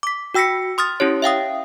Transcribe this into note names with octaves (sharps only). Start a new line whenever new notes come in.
D6 B6
F#4 G5 E6 A#6 B6 C#7
C6 D#6 F6 A6
C#4 E4 G4 C#5
E5 F5 G5 D#6